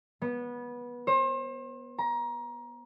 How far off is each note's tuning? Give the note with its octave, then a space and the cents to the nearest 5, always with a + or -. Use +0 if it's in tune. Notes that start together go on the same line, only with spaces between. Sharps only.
B3 -20
C5 +35
A#5 +25